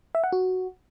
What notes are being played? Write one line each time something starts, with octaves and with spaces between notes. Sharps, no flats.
E5
F#5
F#4